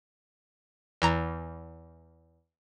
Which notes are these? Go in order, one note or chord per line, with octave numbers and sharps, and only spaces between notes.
E2 E3 A#5